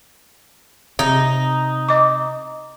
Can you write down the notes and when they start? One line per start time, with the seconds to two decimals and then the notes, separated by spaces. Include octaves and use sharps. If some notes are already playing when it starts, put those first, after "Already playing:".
0.99 C3 D#4
1.88 D#5 D6